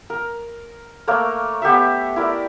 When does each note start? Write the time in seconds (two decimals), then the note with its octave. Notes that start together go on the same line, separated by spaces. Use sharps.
0.10 A#4
1.07 A3 A#3 A#4 C#5
1.62 B3 G4 A4 E5
2.16 E4 A#4 D5